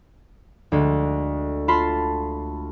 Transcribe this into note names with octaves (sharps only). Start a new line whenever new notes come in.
D2 G#3
F4 A5 B5 C6